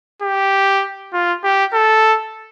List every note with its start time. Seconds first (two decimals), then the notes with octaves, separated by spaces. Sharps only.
0.23 G4
1.13 F4
1.44 G4
1.73 A4